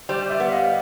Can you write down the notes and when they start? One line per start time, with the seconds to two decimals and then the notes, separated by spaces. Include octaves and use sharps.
0.09 G3 C5 D5
0.30 D5 E5
0.40 B3
0.51 D#5 F5